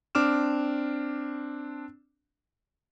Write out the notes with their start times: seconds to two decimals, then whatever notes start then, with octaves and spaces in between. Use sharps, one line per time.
0.15 C4 D4 D6 F6 E7